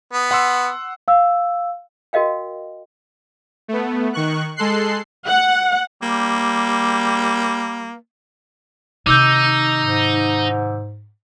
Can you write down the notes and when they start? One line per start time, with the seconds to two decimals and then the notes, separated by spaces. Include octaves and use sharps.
0.13 B3
0.31 F#5 C6 E6
1.08 F5 E6
2.13 F#4 A#4 D#5 F5 G5
3.68 A3 B3
4.13 D#3 C#6 F#6
4.56 G#3 A4 C6 F#6 C7
5.26 F#5
6.02 G3 A#3
9.06 C3 D#3 D#4 D6 E6 G6
9.78 G#2